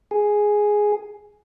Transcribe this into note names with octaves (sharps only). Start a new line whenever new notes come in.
G#4